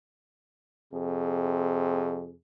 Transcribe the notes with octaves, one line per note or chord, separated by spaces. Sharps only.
F2 C3 G#4